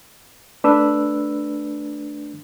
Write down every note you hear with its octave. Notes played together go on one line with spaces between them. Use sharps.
A3 D4 B4 E6